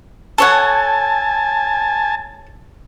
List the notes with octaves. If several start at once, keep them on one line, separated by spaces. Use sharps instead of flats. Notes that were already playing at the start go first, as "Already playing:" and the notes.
A4 C#5 F#5 G#5 A5